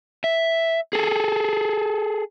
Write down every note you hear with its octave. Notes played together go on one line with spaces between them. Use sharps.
E5
G#4 A4